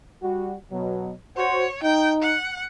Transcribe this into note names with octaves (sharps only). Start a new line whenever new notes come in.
G3 F#4
B2 F#3
F#4 C5 C#5
D#4 G5
F#5